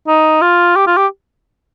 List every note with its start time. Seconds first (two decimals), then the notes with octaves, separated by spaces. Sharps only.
0.08 D#4
0.42 F4
0.76 G4
0.87 F4
0.97 G4